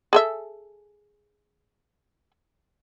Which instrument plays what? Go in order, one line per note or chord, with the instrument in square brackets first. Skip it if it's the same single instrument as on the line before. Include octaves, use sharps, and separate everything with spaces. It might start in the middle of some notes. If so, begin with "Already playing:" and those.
[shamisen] G#4 A4 E5